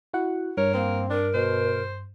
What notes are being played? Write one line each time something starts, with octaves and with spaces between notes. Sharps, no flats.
E4 F#4 F#5
G2 A#4 C#5
A#3 C4
D4 A#4
B2 C5